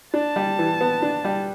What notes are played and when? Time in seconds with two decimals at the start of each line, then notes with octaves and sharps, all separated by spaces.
0.14 D4 A5
0.36 G3
0.59 E3
0.81 B3
1.02 D4
1.24 G3